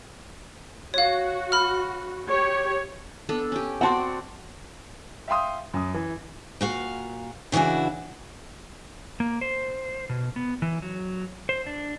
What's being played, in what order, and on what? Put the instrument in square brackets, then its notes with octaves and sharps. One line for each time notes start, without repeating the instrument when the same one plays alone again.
[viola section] F#4 [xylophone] C#5 F5
[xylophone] B5 F6
[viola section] G4 C#5
[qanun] B3 D4 A4
C#4 G4
[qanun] C4 F#4 D5 [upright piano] F#5 A5 C6
[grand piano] E5 F5 G5 C6 D#6
F#2 D#6
E3
[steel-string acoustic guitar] A#2 F#4 F5
C#3 E3 D4 E4 F#4
[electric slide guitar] A#3
C5
B2
B3
E3
F#3
C5
D4